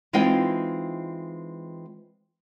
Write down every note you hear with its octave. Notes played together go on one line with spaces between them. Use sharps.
E3 G#3 C4 D#4 F4 G5